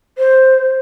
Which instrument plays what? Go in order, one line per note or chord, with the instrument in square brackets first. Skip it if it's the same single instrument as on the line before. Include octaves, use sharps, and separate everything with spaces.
[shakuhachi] C5